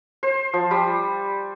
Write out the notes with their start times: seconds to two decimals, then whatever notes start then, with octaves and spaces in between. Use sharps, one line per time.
0.23 C5
0.54 F3
0.71 G3